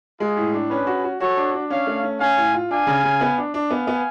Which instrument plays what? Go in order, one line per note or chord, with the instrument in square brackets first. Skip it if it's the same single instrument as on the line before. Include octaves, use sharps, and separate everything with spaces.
[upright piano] G#3 [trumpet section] F4 G#4
[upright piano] A2
D4
[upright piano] C#4 [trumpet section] G#4 B4
[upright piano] F#4
F#4
[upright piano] F#4 [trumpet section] A4 C#5
[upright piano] D4
D4
[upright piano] C#4 [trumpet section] C#5 F5
[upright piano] A3
C#4
[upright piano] C#4 [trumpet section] F5 G#5
[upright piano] A2
F4
[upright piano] D4 [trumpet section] F5 G#5
[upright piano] C#3
C#3
B3
D4
D4
[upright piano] B3 [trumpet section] F5 G#5
[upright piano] B3